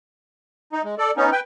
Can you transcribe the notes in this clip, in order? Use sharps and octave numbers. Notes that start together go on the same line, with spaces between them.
D#4
G#3
A4 D5
B3 C#4 D#4
B4 G5